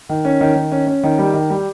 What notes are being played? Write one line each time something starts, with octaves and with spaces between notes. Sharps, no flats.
D#3
C#4
D#3
D#3
C#4
C#4
D#3
G3
D#3
G3